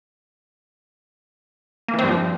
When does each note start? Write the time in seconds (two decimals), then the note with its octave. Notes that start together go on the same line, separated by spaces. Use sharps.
1.88 A#3
1.94 E3
1.99 C4
2.04 G2
2.09 F3